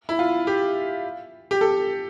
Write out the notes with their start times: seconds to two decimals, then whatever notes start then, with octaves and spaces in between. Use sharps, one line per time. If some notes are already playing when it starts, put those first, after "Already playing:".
0.09 E4
0.19 F4
0.47 G4
1.51 G4
1.61 A4